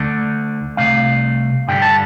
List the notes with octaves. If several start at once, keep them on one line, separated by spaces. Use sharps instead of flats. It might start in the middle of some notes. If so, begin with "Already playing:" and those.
Already playing: D2 D3 A3 D5
C2 C3 A3 F5
G2 D3 G3 G5
A5